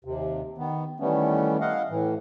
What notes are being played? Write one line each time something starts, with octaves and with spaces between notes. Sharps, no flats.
D#2 C3
D#3 B3
D#3 E3 G3 A3 B3 C#4
E4 D#5 F5 F#5
A2 E3